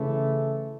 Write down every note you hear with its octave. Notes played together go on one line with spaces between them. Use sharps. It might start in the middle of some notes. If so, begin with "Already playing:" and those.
Already playing: C#3 E3 A3